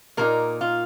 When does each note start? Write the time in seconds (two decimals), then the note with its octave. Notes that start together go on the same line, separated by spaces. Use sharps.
0.17 A#2 A#3 D#4 A#4
0.61 F4